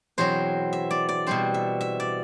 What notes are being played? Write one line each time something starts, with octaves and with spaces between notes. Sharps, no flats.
E2 B2 F#3 C4 C5
E5
D5
D5
B2 G3 C4 C5
E5
E5
D5